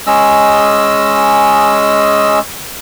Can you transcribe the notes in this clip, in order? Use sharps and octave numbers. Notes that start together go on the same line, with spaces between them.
G#3 C#4 D#5 E6